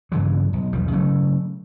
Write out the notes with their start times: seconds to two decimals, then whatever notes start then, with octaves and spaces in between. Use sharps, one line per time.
0.12 G2 C#3 E3 F#3
0.53 B1
0.73 B1 E2 D#3 G3
0.92 C#3 F#3 A3